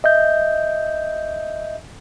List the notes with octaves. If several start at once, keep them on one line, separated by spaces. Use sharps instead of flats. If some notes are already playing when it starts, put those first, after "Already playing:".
D#5 E5 G6